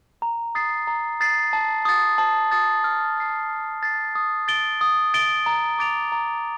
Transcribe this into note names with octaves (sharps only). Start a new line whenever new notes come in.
A#5
D#6 A6 C7
A#5
D#6 A6 C7
A5
D#6 A6
A5
D#6 A6
F6
A6 C7
F6
A6 C7
D#6
A6 D7 G7
D#6
A6 D7 G7
A#5
D6 A6 D7 F7
A#5